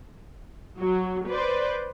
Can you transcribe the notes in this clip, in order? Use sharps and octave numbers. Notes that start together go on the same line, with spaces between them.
F#3
B4 C5 D5